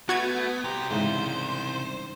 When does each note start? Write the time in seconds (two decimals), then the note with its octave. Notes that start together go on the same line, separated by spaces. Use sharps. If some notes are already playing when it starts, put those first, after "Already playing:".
0.09 A3 B3 F#4 G#6
0.64 C2 G4 C5 A#5
0.91 G#2 C#3 E3 C5